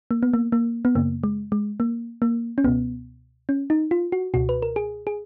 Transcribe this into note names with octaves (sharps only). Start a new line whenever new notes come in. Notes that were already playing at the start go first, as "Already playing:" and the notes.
A#3
B3
A#3
A#3
B3
F#2 C#3 A#3
G#3
G#3
A#3
A#3
C#4
C#2 B2 B3
C#4
D#4
F4
F#4
C#2 B2 F#4
B4
A#4
G#4
G#4